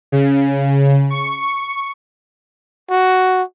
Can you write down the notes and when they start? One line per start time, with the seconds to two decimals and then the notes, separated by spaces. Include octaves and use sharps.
0.12 C#3
1.10 C#6
2.90 F#4